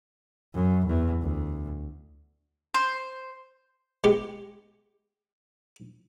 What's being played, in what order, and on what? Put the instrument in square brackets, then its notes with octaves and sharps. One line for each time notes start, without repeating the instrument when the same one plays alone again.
[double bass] F#2
E2
D2
[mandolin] C5
[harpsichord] G#3 B3 G4